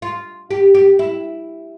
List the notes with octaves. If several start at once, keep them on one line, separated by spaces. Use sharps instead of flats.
F4
G4
G4
E4